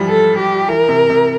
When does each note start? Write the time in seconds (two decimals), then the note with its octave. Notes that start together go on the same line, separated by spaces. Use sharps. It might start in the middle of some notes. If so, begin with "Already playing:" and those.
Already playing: E3 F3 G3
0.09 A4
0.38 G4
0.68 E3 A#4
0.89 C3
1.10 C3